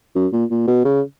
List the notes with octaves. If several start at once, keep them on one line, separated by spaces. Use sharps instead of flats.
F#2
A#2
A#2
B2
C#3